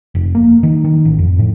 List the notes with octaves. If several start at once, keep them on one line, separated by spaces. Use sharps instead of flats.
F1
A#3
D#3
D#3
A1
F2
A2